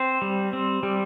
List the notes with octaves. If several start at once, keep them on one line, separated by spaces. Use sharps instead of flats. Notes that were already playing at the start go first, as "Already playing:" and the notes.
Already playing: C4 C5
G3
C4
G3